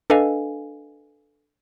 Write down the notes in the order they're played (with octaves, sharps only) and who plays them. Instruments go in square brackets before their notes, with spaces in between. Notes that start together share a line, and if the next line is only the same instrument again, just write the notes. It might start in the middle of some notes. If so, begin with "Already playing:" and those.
[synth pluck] D4 A4 B4 D#5 F5 G#5